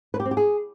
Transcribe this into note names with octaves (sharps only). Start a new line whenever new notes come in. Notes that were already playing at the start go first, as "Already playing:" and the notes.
B4
G4
C4
G4
G#4